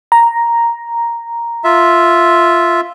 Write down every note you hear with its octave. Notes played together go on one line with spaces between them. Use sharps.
A#5
F4 E5